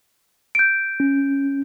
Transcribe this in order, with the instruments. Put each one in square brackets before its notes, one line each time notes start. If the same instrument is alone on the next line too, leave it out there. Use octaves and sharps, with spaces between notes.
[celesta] G6 D7
[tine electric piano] C#4